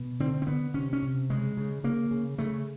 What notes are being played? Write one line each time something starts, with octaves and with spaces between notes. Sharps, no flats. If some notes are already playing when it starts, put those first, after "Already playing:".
Already playing: B2
D3 C4
C4
D3 B3
C3 C#4
C#4
C3
C#3 G#3
C#3
C#3 A#3
C#3
C#3 A3